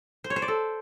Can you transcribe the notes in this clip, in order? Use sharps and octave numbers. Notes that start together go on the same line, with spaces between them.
C5
C#5
C5
D5
A4